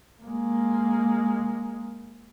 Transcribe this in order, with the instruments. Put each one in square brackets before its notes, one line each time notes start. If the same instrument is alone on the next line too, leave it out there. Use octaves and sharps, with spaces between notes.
[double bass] G#3 A#3